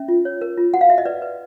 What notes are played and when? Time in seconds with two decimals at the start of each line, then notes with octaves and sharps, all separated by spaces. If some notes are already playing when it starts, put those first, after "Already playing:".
Already playing: C#4 E5
0.08 F4
0.25 C#5
0.41 A#4
0.58 F4
0.74 F#4 F#5
0.81 F5
0.90 F#4 E5
0.98 D#5
1.06 B4 D5
1.22 B4